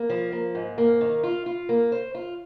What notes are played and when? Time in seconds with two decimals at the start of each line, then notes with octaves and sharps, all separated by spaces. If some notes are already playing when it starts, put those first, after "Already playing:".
Already playing: A#3
0.10 F3
0.32 A#3
0.55 G#2
0.78 A#3
1.01 D#3
1.23 F4
1.46 F4
1.69 A#3
1.92 C5
2.15 F4